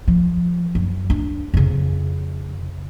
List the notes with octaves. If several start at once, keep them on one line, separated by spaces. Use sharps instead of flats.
F3
F#2
D4
F2 C#3